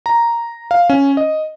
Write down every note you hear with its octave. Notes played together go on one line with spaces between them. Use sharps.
A#5
F5
C#4
D#5